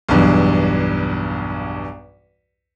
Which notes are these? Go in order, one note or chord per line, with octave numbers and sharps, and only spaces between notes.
B1 E2 G2